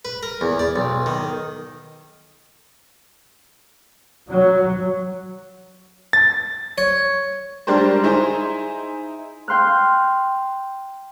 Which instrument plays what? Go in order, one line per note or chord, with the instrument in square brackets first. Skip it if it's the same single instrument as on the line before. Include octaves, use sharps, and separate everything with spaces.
[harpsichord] B4
A#4
E2
D5
B1
D#3
[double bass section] F#3
[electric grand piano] A6
[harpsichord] C#5
[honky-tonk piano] G3 G#3 D4 G4 A#4 C5
D#4 E4 G#4 C5
[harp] G5 C6 F6 F#6